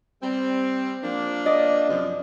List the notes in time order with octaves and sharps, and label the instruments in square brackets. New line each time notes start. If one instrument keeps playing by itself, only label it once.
[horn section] G3 C4
F3 A#3 D4
[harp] D5 D#5 D#6
[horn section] F#2 C3 F3